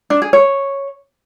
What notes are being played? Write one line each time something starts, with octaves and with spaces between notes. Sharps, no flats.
D4
G#4
C#5